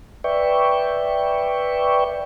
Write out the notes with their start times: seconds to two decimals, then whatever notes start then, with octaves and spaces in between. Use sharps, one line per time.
0.24 B4 D5 E5 G5 C#6